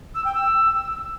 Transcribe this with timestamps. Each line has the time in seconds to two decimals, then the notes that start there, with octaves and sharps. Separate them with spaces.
0.15 E6
0.25 G5
0.35 E6